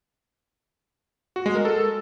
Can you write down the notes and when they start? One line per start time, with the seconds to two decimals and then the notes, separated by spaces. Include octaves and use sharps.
1.36 F#4
1.46 G#3
1.55 A#4
1.65 A4